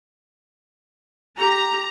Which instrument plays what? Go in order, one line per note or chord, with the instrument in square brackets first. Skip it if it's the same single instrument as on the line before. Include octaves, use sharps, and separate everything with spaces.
[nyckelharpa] G4 [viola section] A#5